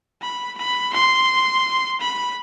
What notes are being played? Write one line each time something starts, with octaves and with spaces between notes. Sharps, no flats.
B5
B5
C6
B5